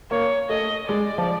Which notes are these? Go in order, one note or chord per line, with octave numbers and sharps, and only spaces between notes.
A#3 C#5
A3 D#5
G#3 D5
F3